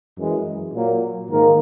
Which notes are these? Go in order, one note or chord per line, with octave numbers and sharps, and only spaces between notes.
F#2 E3 G#3
A#2 F#3 A#3
G#2 D#3 A#3 A#4